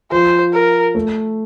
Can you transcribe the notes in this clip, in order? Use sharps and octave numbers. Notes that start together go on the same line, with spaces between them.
F3 C5
A#4
A3